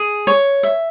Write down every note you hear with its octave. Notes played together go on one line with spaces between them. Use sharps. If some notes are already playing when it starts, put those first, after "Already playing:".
Already playing: G#4
C#5
E5